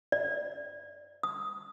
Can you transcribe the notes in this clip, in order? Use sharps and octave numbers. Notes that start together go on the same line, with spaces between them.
D5
D#6